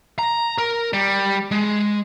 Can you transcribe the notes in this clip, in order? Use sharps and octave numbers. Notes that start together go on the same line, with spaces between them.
A#5
A#4
G3
G#3